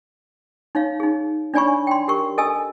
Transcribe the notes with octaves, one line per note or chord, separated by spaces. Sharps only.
D#4 C#5 F5
D#4 G#4
D4 C#5 D5 G#5 B5 C#6
G5 C6
G4 A#4 C#6
A4 D#5 G#5 E6